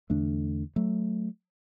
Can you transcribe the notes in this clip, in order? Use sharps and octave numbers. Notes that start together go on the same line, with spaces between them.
E2 D3 A3 D4
F#3 A3